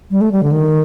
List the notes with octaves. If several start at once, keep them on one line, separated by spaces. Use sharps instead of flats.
G3
A3
G3
D3
D#3